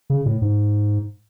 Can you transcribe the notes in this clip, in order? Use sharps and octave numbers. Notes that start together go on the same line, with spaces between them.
C#3
A2
G#2